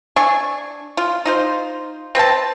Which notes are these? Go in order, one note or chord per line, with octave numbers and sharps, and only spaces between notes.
D4 G#5 C#6
F4
D#4 F4 C5
C4 B4 G5 A5